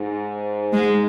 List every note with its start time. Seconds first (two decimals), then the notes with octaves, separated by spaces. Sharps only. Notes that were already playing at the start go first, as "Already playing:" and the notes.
Already playing: G#2
0.73 G#3